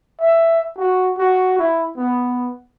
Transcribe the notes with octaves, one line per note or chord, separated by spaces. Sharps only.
E5
F#4
F#4
E4
B3